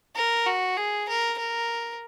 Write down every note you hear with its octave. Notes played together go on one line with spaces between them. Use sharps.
A#4
F#4
G#4
A#4
A#4